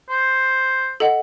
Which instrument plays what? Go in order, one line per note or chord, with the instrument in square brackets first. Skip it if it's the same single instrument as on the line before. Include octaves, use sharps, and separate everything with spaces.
[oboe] C5
[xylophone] A4 D#5 F#5